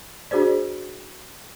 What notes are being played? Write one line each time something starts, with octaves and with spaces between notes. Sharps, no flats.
D4 F#4 G#4 C5 D5